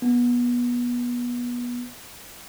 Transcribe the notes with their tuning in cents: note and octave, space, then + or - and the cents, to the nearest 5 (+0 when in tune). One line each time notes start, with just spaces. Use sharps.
B3 -25